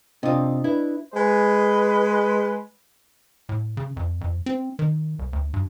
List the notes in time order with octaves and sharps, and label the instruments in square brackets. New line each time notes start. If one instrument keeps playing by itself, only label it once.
[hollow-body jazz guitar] C3 F4 [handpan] D4 D#5
[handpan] D4 B4 [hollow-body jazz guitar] E4
[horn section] G#3 B4
[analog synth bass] A2
C#3
F2
F2
C4
D#3
C2
D2
G2